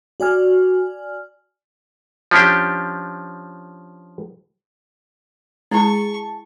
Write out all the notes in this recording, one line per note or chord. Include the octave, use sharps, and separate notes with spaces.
F#4 D5 G#5 F6
F3 C#4 D4 G4
G#3 E4 G#4 A5 C#6